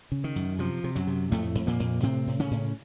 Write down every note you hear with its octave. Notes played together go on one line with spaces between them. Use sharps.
C#3
D#3
F#2
C3 F3
C3
F#2 F#3
C3
F2 A2 A3
F2
A#2 A#3
F2
A2 C3 C4
A2
C#3 C#4
A2